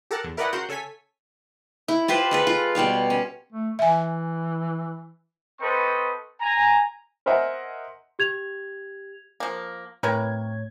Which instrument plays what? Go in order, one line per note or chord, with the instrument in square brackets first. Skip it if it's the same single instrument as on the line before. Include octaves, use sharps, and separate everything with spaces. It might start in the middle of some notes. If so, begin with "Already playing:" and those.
[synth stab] G4 A4 A#4 F#5 A5
E2
E4 A#4 B4 D5 D#5 F#5
C#3 F#4 A#4 F#5 C6 G6
C#3 A4 C#5 G#5 B6
[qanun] E4
F4 G4 B4 C5
G#3 A4 B4
F4
B2 G3 C#5 F5
C#4
[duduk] A3
[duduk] E3 [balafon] E5 G#5
[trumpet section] C4 A4 B4 C5 D#5 C#6
G#5 A#5
[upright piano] A#4 C5 D#5 E5 F#5 G#5
[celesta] G4 G#6 F7
[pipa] F3 A#3
[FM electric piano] A2 C#5 G#6 [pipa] C3 A#4 B4